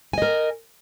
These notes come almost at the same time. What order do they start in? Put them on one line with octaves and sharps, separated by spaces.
G#5 D#5 A#4